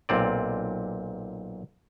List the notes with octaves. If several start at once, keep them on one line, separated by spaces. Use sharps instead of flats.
B1 A#2 C4 D5